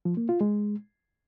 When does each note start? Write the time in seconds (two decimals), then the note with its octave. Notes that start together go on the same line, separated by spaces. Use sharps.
0.05 F3
0.17 A#3
0.29 F4
0.41 G#3